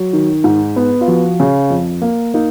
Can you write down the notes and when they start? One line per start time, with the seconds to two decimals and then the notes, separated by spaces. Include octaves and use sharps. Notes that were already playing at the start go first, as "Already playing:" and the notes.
Already playing: F#3
0.13 D#3
0.44 G#2
0.76 B3
1.01 F4
1.08 F3 F#4
1.40 C#3
1.70 F2
2.02 A#3
2.34 A#3 D#4